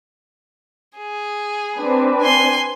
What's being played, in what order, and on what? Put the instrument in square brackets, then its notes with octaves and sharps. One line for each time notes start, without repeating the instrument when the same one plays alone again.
[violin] G#4
[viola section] C4 D4 B4
[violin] G#5 C6